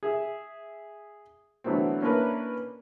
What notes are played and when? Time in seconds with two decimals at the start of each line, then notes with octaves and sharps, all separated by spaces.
0.03 G#4 E5
1.64 D3 E3 F#3 A3 B3 C4
2.02 A#3 C#4 D4 E4 A#4 B4